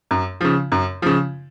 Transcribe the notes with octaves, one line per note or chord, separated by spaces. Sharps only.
F#2
C#3 F3
F#2
C#3 F3